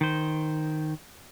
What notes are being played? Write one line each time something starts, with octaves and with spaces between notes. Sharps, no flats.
D#3 C5